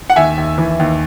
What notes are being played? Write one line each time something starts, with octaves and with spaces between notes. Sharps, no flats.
F#5
D#2 E5 G#5
D#2
E3
D#2